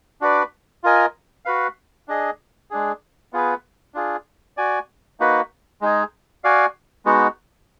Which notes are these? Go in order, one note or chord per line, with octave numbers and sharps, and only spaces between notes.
D4 F#4 B4 D5
F4 A#4 D#5 G#5
F#4 B4 F5
D4 G#4 D#5
G#3 D4 G#4
B3 F4 G#4 B4
D4 F4 G#4
F#4 D5 G#5
A#3 D#4 F#4 B4
G#3 D#4 G#4
F#4 D5 F5 G#5
G#3 B3 D#4 F#4